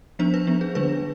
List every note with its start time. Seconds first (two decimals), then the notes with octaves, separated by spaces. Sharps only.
0.19 F3 B3 D4 C5
0.34 B4
0.47 F3 B3 D4
0.61 G#4
0.75 D3 G3 D4 B4